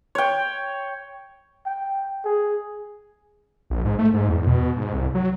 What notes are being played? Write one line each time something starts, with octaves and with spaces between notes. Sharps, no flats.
C#5 G5
G5
G#4
A#1
G#2
A3
G#2
E2
B2
G#2
C2
F#3